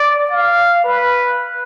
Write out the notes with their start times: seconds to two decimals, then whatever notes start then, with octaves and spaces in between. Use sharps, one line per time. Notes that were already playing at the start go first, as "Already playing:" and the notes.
Already playing: D5
0.31 F5
0.84 B4